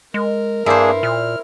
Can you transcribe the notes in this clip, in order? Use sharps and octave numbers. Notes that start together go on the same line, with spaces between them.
G#3 A#4
G2 A#3 D4 E4 G#4 C5
A#2 F6